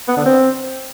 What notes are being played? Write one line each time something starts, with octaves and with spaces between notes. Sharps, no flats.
B3
D3
C4